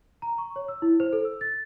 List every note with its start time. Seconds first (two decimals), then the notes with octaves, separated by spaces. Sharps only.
0.22 A#5
0.38 C#6
0.56 C#5
0.68 E6
0.82 E4
1.00 C5
1.13 A4
1.25 E6
1.41 A6